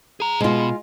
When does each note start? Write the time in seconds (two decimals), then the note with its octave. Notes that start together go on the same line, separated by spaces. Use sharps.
0.20 G#4 A#5
0.41 B2 G#3 F4